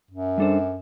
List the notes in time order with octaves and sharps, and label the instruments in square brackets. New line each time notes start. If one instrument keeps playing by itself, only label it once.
[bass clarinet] F#2
[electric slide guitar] G3 D4 A4 C5